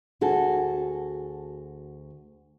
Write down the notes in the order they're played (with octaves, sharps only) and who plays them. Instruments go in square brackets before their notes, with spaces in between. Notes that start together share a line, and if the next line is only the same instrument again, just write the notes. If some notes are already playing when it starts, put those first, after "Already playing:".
[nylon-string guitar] D2 F#4 G#4 A4